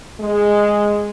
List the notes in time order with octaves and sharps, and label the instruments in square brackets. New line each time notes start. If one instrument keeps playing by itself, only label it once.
[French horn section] G#3